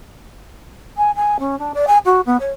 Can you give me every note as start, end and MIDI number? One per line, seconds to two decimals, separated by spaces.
0.97 1.11 80
1.16 1.37 80
1.39 1.58 61
1.59 1.72 62
1.74 1.85 74
1.87 1.98 80
2.05 2.21 66
2.26 2.37 59
2.40 2.50 73